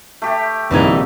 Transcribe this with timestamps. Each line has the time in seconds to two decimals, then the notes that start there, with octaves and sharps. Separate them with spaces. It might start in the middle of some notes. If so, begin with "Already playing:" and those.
0.22 A3 G4
0.71 A#1 C3 D#3 E3 G3 D#4 G#6